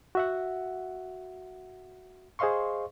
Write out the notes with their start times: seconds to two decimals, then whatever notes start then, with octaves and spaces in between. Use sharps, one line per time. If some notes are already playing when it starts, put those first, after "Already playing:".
0.15 F#4 E5 F#5
2.39 G#4 C5 D#5 F5 C6 C#6